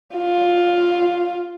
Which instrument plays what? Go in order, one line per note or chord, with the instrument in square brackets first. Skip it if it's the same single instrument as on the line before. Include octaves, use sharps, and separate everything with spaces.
[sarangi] F4